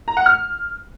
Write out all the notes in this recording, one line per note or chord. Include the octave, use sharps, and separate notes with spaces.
A#5
F#5
F6